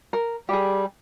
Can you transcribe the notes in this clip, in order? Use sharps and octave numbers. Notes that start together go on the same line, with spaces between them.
A#4
G3 G4 G#4